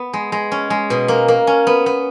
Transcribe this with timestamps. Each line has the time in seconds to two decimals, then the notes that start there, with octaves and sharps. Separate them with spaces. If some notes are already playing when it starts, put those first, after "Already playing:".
Already playing: B3
0.13 G#3
0.32 G#3
0.52 C#4
0.70 G#3
0.90 B2
1.08 A#3
1.28 A#3
1.47 C#4
1.67 B3
1.86 B3